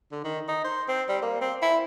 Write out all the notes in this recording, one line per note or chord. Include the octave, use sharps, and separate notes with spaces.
D3
D#3
D#4
C5
C4
G3
A#3
C4
E4